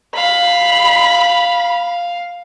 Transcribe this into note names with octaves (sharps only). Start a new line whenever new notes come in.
F5 B5